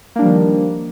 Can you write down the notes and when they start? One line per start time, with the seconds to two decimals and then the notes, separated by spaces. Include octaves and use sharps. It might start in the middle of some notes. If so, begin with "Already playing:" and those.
0.16 A#3
0.19 D4
0.22 G3
0.25 F3
0.28 D#3